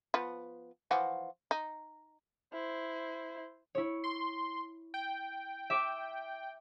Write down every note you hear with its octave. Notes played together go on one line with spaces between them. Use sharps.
F3 B3
E3 F3 F#4
D#4
E4 C5
E4 C#5
C6
G5
E5 D6